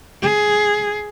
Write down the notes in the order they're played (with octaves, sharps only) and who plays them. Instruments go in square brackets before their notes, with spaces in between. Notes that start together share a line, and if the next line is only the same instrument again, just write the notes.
[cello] G#4